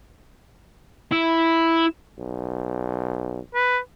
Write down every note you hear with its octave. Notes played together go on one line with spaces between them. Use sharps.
E4
B1
B4